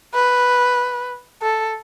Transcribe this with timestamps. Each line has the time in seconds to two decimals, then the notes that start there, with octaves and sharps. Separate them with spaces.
0.14 B4
1.42 A4